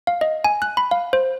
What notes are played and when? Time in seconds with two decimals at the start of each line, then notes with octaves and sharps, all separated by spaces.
0.07 F5
0.21 D#5
0.44 G#5
0.62 F#6
0.77 B5
0.91 F5
1.13 C5